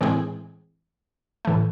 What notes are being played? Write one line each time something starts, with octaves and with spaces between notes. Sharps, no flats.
A2 E3 G#3 C4 G#4
A2 E3 A3